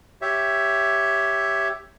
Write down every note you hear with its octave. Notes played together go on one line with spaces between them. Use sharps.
G4 C#5 E5